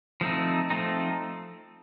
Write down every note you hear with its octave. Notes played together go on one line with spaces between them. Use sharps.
F3 A3 C4 D#4
F3 A3 C4 D#4